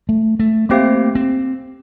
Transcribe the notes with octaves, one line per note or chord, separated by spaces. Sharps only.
A3
A3
A3 A#3 C4 G4 C5 F5
C4